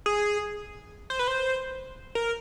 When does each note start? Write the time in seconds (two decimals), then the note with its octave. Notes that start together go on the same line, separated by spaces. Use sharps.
0.06 G#4
1.10 C5
1.19 B4
1.28 C5
2.15 A#4